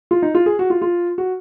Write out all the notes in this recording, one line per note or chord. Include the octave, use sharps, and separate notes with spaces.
F4
D#4
F4
G#4
F#4
F4
F4
F#4